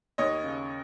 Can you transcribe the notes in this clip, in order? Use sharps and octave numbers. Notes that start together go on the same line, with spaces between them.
D#2 C#5 D#5
C#3